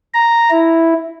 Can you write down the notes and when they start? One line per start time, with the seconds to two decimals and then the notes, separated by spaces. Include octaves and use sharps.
0.14 A#5
0.50 E4